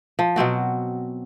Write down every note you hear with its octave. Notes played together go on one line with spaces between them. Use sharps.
F3
B2 F#3 C4 F#4